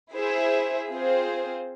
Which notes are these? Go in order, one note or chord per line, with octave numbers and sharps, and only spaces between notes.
E4 G#4 C5 E5
C4 F4 G#4 C5